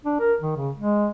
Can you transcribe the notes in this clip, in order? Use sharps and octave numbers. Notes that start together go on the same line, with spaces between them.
D4
A#4
D#3
C#3
G#3